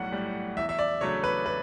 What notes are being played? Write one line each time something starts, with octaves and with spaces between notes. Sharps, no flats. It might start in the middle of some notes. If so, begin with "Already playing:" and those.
Already playing: B1 A2 G3 F#5
A2 G3
E2 E5
E5
D5
C#3 F#3 A3 D4 C#5
B4
B4